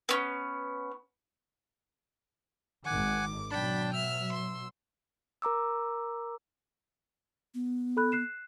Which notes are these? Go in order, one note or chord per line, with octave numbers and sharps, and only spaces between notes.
B3 C#4
G#1 D#3 F#5 G#5 D6
B2 F#3 D4 G5 A5 B5
E5 E6 F6
C6
A#4 A#5 D6 E6
B3
A4 B5 F#6
F#6 C7 E7